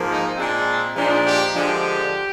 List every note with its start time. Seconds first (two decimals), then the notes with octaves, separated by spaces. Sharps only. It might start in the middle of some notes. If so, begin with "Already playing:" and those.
Already playing: G#2 F3 A#3
0.09 D#4
0.37 A#2 G#3 C4 D4
0.96 A#2 F3 G#3 D4 D#4
1.26 G4
1.55 D3 F3 G#3 D4 G4